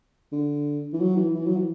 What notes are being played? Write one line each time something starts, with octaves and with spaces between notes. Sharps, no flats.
D3
E3
F#3
E3
E3
F#3
E3